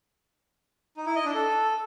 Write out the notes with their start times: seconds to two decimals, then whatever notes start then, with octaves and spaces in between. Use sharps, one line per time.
0.97 D#4
1.06 E4
1.16 D#5
1.25 D4
1.34 A4